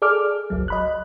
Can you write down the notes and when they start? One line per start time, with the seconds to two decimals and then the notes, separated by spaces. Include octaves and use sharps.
0.02 G#4 A4 D5 D6 F6
0.50 G1 C#2 F#3
0.68 D#5 B5 F#6